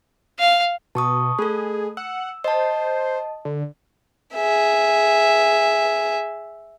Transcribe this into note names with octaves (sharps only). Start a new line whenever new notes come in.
F5
B2 A5 C#6 D#6
A3 G#4 A4
F#5 E6
C5 D#5 A5
D3
G#4 E5